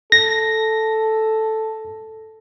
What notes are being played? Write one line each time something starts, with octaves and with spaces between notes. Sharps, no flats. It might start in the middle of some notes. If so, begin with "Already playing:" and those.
A4 A#6